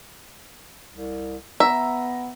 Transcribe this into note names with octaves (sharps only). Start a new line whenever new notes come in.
C2
B3 E5 A#5